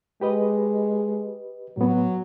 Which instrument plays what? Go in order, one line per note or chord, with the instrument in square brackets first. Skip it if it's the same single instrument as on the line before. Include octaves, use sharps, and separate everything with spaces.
[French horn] G#3 [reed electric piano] G4 B4 D#5
[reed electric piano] A2 B3 [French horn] F#3